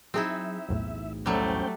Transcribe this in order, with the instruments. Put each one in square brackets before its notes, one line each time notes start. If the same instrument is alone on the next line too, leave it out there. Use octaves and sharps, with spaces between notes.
[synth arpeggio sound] F#3 G#4 [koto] C4 D#4 E4 [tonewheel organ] E5
[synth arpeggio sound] B1 E2 A2
[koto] F#3 G3 [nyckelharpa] A3 [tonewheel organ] C#4 C5 G5